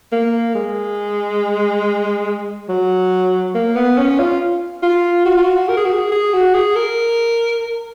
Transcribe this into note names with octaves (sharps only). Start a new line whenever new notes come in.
A#3
G#3
F#3
A#3
B3
C#4
F4
F4
F#4
F4
F#4
A#4
G#4
F#4
G#4
G#4
F#4
G#4
A#4